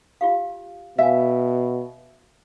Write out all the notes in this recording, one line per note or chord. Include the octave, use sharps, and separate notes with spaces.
F4 G4 F5
B2 E5 F5 G#5